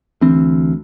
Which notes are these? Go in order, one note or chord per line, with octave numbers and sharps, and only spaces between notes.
D2 E3 C4